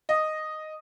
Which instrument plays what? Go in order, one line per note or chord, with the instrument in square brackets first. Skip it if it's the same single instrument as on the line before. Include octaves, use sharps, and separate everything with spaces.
[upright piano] D#5